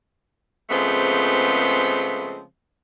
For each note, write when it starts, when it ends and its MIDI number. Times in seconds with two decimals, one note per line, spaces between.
0.70 2.43 49
0.70 2.43 53
0.70 2.43 56
0.70 2.43 57
0.70 2.43 59
0.70 2.43 60